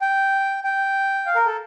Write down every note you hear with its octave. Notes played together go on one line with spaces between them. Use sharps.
G5
G5
F5
A#4
A4